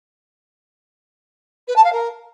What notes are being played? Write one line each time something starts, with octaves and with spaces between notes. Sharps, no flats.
B4
A5
F5
A#4